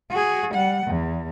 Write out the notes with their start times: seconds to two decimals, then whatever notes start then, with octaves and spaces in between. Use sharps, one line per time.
0.10 F#4 G#4
0.54 G3 F#5
0.86 E2